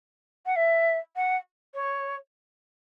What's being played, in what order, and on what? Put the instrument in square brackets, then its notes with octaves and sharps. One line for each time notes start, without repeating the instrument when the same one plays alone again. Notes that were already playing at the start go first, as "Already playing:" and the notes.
[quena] F#5
E5
F#5
C#5